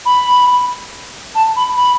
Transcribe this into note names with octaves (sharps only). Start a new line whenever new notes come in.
B5
A5
B5
B5